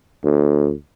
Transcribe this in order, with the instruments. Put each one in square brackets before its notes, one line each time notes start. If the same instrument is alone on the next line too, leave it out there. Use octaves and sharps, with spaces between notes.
[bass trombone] D2